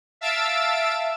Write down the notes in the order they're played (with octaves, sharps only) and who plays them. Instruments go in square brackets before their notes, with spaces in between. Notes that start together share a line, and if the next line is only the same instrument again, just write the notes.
[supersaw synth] E5 F5 A5 E6 A6 D7